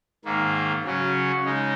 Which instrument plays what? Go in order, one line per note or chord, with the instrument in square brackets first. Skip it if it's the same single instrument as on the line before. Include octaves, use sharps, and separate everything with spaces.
[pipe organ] G#2 D#3 A#3
C#3 F#3 C#4
C#3 G#3 D#4